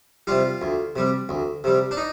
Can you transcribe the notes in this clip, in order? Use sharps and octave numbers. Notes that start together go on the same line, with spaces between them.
C3 G3 F4
D2
C3 G3
D2
C3 G3
D4
D#4